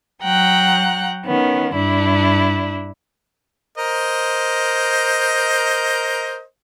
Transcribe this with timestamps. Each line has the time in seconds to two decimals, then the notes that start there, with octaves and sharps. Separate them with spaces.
0.23 F#3 F#5 G5 A#5 F#6
1.26 D#3 B3 C#4
1.74 G2 D4 E4
3.78 A#4 C5 D#5